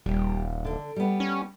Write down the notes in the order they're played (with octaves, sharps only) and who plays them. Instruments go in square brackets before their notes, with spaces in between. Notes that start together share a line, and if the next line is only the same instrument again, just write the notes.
[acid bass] D#1 [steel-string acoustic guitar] G3
[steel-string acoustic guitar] D3 D4
G3 B3
[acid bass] C#4